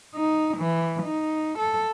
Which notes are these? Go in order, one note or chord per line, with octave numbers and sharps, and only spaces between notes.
D#4
E3
D#4
A4